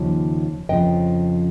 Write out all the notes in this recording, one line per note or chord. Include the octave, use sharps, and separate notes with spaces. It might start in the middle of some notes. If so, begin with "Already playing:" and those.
Already playing: D#2 C#3 F3 C#5
F2 C#3 F3 D#5 G5